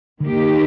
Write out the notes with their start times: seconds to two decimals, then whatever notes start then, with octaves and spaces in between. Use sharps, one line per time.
0.20 D3 D#3 A#3 D#4 G4